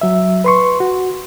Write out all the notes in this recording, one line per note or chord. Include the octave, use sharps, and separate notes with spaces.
F#3 E5
B4 C6 C#6
F#4